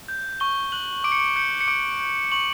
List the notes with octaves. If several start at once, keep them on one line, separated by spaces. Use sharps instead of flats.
G6
C#6 G7
F#6 F#7
D6 D7
C#7
D7
G6 C#7
C#7
D6 D7
G6
C#6 F#7